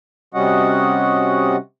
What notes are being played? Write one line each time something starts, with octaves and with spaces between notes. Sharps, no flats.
C3 G3 C#4 F#4 D#5 F#5